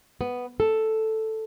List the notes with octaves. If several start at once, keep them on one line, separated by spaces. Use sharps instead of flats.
B3
A4